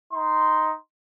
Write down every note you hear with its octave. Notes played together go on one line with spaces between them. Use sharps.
D#4 C6